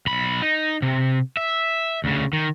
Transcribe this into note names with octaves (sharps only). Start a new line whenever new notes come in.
B1 B5
D#4
C3
E5
D2 C#3
D#3